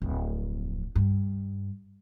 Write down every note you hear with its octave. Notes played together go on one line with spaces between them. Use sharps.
D1 F2
G2